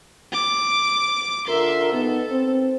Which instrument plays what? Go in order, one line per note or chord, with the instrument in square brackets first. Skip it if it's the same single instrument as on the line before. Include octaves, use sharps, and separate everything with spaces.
[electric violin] D6
[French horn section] D3 F4 A#4 [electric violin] E5 C6
[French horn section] D#3 B3 [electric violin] A4
[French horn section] C4